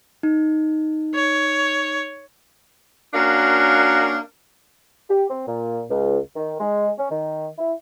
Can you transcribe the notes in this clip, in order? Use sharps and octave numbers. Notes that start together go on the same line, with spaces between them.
D#4
C#5
A#3 C#4 D4 F#4 A#4 F5
G4
C4
A#2
C#2
D#3
G#3
C#4
D#3
E4